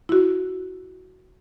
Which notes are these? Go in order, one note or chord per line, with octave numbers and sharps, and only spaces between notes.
E4 F#4